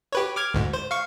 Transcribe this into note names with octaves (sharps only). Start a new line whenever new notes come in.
G4 B4 C#5
D6 F6 G#6
D2 G#2
C5
F5 C#6